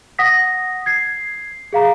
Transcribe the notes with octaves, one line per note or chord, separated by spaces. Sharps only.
F#5 D#6 A#6 B6
G#6 C7
G#4 F5 A#5